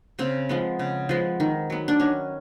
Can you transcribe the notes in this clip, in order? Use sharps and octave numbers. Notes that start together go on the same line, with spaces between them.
C#3 C4
F3 G#3 B3
C#3
F3 G#3 B3
D#3
F#3 B3
D4
D#3 C#4